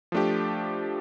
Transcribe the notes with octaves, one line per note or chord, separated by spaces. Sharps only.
F3 A3 D4 G4